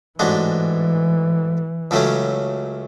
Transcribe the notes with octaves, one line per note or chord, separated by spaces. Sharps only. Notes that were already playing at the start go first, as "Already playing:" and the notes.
A1 G#2 E3 G#3 D4 F#4
C#2 C#3 F#3 A3 C#4